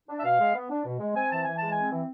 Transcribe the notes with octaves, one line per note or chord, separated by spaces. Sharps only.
D4
E5
B2 F5
G#3
B3
D4
B2
G#3
C4 G#5
E3 A5
E3 G#5
G#3 A5
G#5
C4
E3